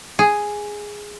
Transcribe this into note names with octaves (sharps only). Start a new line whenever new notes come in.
G#4